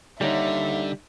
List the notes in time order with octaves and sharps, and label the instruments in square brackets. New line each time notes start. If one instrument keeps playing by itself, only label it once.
[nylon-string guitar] D#2 C#5 F#5 [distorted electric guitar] D3 [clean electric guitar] G3 D#4 [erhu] E5